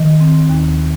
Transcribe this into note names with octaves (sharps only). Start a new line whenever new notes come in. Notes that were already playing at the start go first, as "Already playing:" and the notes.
Already playing: D#3
C4
D#2